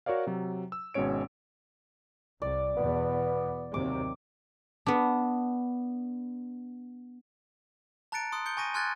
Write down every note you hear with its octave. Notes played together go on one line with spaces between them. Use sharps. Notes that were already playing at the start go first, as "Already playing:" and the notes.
F#4 A#4 C#5 D5 F5
C3 F#3
E6
G#1 B2 G#3 C#4 C#5 D7
C2 D5
E2 B2 B3
D#2 C3 F#3 D6
B3 D4
A5 A#5 F#6 A6 C#7 D7
C6 D#6 F#6
G6 C#7 G7
G#5 C#6 A#6 D#7
G#5 C6 F6 F#6 G#6 A6